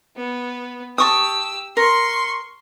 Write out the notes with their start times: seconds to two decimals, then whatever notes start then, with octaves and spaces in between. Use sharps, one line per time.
0.16 B3
0.98 G4 A5 C#6 D#6 E6
1.77 A#4 C6 C#6